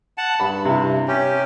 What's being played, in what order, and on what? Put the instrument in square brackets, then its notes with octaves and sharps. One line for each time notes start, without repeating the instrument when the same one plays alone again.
[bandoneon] F#5 A5
[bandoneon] G2 [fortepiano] B5
[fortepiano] C3 E4
[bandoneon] C#4 G4